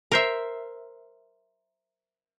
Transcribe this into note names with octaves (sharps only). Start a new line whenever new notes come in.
A#4 C5 E5